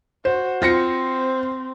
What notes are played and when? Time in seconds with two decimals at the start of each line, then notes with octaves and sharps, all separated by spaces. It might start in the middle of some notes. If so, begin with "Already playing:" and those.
0.25 F#4 C5
0.62 C4 F4 A#6 C#7